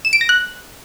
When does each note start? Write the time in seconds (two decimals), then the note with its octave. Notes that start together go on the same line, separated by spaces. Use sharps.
0.05 E7
0.13 D7
0.21 A#6
0.29 F#6